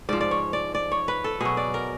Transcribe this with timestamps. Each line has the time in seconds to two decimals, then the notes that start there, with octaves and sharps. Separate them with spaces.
0.09 G#2 F3 D5
0.21 D5
0.31 C#5
0.53 D5
0.75 D5
0.92 C#5
1.08 B4
1.24 A4
1.41 B2 F#3 G#4
1.57 D5
1.74 A#4